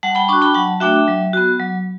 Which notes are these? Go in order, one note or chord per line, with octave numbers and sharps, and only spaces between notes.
G3 F#5 A5
G5 B5
D4 F#4 A5 C#6
G5 B5
F#3 F#5 A5
A3 D4 F#4 E5 G5
F#3
B3 F#4
F#3